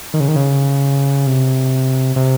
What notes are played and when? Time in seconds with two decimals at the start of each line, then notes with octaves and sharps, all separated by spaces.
0.14 D#3
0.20 C#3
0.28 D#3
0.36 C#3
1.27 C3
2.16 C3